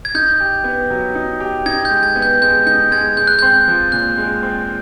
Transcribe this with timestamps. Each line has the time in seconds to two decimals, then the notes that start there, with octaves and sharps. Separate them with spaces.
0.05 G#6
0.15 D#4 G6
0.40 G4
0.64 B3
0.90 F#3
1.15 D#4
1.40 G4
1.66 D#4 G#6
1.85 G6
1.91 G#3
2.03 G#6
2.16 B3
2.22 G6
2.42 G#3 G6
2.67 D#4 G6
2.92 G#3 G#6
3.17 G#3 G6
3.27 F#6
3.39 C4 G6
3.68 F3
3.92 A#2 F#6
4.18 G#3
4.43 C4